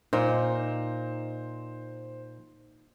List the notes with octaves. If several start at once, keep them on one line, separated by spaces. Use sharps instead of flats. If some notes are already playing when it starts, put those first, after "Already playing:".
A#2 D#4 C5